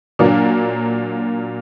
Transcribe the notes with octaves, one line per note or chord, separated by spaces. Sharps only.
A#2 F#3 A#3 D4